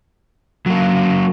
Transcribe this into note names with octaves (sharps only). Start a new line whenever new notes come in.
F#3 A#3